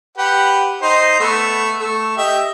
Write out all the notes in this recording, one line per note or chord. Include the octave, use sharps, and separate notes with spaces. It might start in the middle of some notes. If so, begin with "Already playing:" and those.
G4 B4 F#5
D#4 C5
A3 B3
A3
G4 D#5 E5